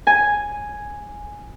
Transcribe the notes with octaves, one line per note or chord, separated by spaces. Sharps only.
G#5